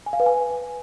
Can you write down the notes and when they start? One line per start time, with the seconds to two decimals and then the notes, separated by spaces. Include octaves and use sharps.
0.06 G#5
0.13 F5
0.20 B4
0.26 G#5